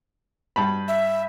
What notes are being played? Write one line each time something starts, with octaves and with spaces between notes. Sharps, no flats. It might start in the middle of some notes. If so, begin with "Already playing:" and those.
G2 A5 B5
E5